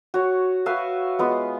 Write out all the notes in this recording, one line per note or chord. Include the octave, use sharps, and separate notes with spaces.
F#4 C#5
F#4 B4 E5 F5
G#3 B3 F4